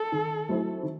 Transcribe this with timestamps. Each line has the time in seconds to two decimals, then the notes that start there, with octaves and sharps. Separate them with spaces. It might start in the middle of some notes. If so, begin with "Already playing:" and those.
Already playing: A4
0.12 D#3
0.49 F#3 A3 C4 E4
0.83 D#3